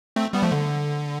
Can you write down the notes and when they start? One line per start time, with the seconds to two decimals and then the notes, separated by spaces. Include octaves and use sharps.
0.16 A3 C4
0.33 G3 B3
0.42 F3 A3
0.52 D3